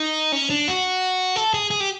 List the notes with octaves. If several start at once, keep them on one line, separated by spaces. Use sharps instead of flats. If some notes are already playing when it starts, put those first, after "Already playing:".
Already playing: D#4
C#4
D4
F#4
A4
G#4
G#4
G4